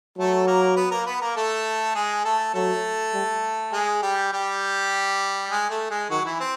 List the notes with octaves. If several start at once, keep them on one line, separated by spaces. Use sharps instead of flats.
F#3 A3 A4
A#3 A#4
B3 B4
A#3 A#4
B3 B4
A#3 A#4
A3 A4
G#3 G#4
A3 A4
F#3 A3 A4
G3
G#3 G#4
G3 G4
G3 G4
G#3 G#4
A3 A4
G#3 G#4
D#3 F#3 F#4
E3 E4
C4